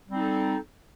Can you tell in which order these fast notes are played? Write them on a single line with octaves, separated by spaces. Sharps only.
G3 C4 D#4 A4